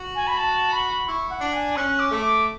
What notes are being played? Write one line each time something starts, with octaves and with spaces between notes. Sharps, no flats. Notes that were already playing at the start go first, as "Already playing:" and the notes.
Already playing: F#4
G#5
B5
A5
B5
E4 C#6
F#5
D4
G#5
C#4 F#6
D6
A3
D6